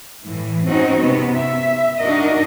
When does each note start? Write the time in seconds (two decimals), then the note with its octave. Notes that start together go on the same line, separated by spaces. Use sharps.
0.24 A2 E3
0.65 C4 C#4 D#4 F#4
1.00 C3 B3
1.35 E5
2.00 D4 D#4 F#4 A#4 D#5